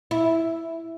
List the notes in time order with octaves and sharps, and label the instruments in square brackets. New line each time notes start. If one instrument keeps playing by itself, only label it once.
[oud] E4